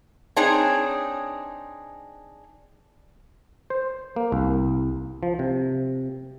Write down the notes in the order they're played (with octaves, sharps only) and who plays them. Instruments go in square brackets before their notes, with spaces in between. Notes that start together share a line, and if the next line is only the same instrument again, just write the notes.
[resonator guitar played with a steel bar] C4 D4 D#4 G#4 C#5
[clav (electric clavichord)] C5
A#3
C2
F3
C3